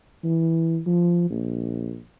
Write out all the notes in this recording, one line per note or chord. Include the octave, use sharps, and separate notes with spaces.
E3
F3
A#1